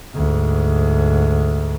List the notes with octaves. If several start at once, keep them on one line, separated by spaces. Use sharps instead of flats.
D2 G#2